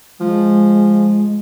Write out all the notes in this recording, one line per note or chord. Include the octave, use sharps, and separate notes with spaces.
F3 G#3